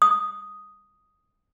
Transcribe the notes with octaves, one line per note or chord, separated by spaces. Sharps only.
D#6